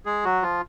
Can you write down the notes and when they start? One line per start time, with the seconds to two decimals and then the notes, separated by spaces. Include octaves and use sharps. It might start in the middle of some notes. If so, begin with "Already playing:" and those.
0.05 G#3 G#4
0.25 F#3 F#4
0.42 F3 F4